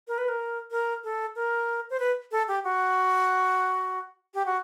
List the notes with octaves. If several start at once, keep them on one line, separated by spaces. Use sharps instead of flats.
A#4
B4
A#4
A#4
A4
A#4
C5
B4
A4
G4
F#4
G4
F#4